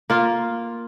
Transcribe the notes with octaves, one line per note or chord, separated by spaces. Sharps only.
A#3 F4